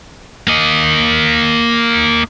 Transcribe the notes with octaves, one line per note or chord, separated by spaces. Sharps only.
A#3 D#5